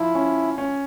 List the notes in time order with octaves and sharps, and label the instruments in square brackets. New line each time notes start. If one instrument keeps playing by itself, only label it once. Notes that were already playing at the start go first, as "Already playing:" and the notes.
Already playing: [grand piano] F3 [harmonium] E4
[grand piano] C#4
C#4